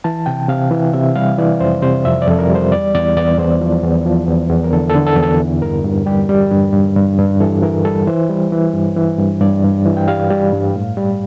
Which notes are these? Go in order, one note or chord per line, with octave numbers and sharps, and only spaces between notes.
E3 A5
C3 G5
C3 F5
E3
C3 E5
G3 F5
E3 D5
F2 C5
C3 C5
F2 E5
D5
F2 A4
A#4
G3
C5
E2 D5
E2 D5
E2 D5
E2 C5
F3
E2
F3
E2
E2
A#4
D3 A4
A4
D3
A4
E2
A4
E3
G2 A#4
G2
G3 G4
G3
G2
G2
G2
G2
E3 A4
E3 A#4
G3 A4
E3 C5
G3
E3
G2
E3
G2
G2 D5
G2
E3
G5
G3 F5
G3
G2
A2
G3